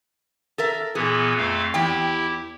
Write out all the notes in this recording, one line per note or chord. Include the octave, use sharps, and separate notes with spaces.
A4 A#4 E5
A#2 E3 B3 G#4
F2 A3 F5
E2 E4 G4 G5